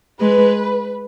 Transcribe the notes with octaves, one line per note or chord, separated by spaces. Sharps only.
G#3 B4